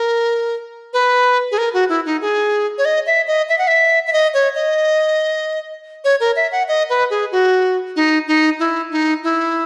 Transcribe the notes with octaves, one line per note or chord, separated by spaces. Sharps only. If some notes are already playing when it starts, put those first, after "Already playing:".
Already playing: A#4
B4
G#4
A#4
F#4
E4
D#4
G#4
C#5
D#5
E5
D#5
E5
F#5
E5
E5
D#5
C#5
D#5
C#5
A#4
E5
F#5
D#5
B4
G#4
F#4
D#4
D#4
E4
D#4
E4